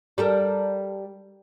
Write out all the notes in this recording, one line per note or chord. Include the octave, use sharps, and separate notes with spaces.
G3 A4 A#4